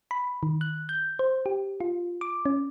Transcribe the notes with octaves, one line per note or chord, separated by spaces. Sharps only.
B5
D#3
F#6
G6
C5
G4
F4
D6
C#4